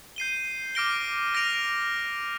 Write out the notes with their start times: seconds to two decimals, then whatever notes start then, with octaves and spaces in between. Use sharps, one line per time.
0.16 G6 C7 D#7 G7
0.75 D6 F6 A#6 D7 G7
1.34 F6 A#6 D7 F7